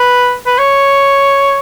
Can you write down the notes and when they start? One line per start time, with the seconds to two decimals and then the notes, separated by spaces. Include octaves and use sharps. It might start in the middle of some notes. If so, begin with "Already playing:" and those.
Already playing: B4
0.46 B4
0.58 C#5